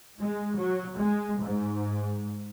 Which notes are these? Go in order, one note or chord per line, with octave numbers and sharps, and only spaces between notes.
G#3
F#3
G#3
G#2